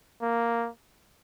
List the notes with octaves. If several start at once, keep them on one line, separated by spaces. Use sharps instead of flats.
A#3